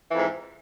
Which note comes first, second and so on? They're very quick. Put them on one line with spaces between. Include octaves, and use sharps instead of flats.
E3 F2 G#2